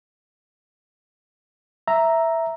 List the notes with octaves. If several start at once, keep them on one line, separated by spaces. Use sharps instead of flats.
E5 A#5